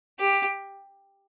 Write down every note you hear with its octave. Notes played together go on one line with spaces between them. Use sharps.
G4